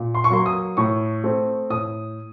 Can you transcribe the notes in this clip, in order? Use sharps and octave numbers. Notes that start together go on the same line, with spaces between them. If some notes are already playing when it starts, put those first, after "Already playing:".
Already playing: A#2
C6
C#6
F#3 A#3 C6
D#6
A2 C#6
A3 C4
A2 D#6